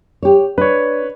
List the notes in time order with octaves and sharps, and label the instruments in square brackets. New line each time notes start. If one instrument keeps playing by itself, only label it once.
[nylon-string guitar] G4 C#5
[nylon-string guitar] D4 [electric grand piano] B4 C#5